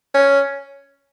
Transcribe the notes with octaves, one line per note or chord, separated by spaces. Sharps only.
C#4